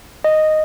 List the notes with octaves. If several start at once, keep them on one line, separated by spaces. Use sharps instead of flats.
D#5